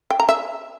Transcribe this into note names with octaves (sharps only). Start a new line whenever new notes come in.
G5
A#5
E5